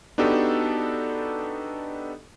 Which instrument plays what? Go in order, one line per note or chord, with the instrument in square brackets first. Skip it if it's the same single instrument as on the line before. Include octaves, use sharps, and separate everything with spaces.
[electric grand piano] B3 D4 D#4 F#4 G4 A4